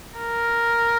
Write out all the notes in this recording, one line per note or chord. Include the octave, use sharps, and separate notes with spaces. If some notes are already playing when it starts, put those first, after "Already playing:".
A#4